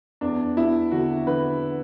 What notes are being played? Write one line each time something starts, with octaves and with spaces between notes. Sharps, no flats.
E2 D4
E2 E4
D3 F#4
D3 B4